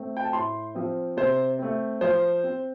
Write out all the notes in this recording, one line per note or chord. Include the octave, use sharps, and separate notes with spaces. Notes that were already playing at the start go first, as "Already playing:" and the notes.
Already playing: A3 C4
G5
A5
A2 C6
F3 C4
C3 C5
A3 C4
F3 C5
C4